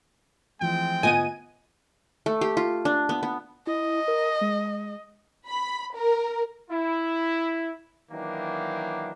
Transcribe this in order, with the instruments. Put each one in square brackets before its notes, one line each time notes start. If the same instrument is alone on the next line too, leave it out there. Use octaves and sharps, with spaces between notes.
[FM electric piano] E3 F3 A3 [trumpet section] G#3 C4 G5
[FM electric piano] G#2 D3 F4 [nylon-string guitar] B3 D#5 [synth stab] G#5 D#7
[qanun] A3
G4
F4
D4
B3
B3
[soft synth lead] E4 [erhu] D#5
[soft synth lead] A#4
G#3
[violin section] B5
A#4
[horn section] E4
D#3 E3 F#3 A#3 D4